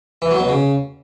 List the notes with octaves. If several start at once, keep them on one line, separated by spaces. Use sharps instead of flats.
E3
F#3
B2
C#3